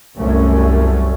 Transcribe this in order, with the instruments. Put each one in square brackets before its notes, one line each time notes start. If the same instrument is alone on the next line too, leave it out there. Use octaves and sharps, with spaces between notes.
[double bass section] C2 F#2 A3 C#4